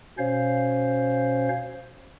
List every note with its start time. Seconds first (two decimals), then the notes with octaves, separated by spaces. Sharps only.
0.18 B2 C#4 C5 C#5 F5